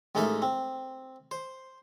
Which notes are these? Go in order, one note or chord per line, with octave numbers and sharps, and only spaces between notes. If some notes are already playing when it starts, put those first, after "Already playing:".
A1 G#3 A#3 D#4 A4 E5
C4
C5